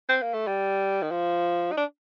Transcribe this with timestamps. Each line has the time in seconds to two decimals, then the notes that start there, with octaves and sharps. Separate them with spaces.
0.09 C4
0.22 A#3
0.33 A3
0.47 G3
1.02 D#3
1.11 F3
1.72 D#4
1.77 D4